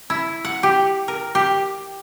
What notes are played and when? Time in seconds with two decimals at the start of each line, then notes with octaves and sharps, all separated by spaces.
0.10 E4
0.45 F#5
0.63 G4
1.08 A#4
1.35 G4